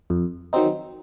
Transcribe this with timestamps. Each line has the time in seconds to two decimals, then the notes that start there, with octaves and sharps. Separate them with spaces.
0.10 F2
0.53 D#3 F#3 C4 D#4